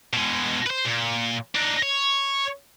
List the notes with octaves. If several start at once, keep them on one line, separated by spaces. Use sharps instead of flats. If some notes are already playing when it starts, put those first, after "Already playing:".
B2 G#3
B4 C5
A#2
D4 D#4
C#5